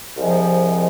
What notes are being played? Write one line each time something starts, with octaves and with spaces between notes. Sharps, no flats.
C2 C3 F3 G#3